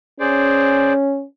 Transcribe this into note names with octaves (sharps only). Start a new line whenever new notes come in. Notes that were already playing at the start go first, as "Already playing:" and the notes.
C#4 G#4 C5 D5